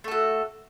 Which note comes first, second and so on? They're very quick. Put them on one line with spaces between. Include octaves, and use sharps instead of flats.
A3 A4 F#4